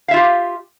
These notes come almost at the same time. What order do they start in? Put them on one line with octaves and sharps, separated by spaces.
F5 E5 F4 G4